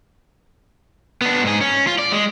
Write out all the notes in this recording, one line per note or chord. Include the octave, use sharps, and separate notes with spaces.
B3 D4
G#2 G#4
C#4
F4
D5
G#3